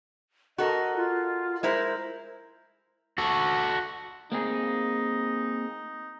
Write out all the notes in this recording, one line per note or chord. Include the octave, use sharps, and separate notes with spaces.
F#4 A4 A#4 D#5
F4
G#3 E4 A#4 C5
F#4 A4
A#3 C4 D#4 G#4